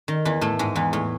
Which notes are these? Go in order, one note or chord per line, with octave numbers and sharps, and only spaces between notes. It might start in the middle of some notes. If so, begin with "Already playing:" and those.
D#3
E2 E3
A2 A3
G#2 G#3
E2 E3
A2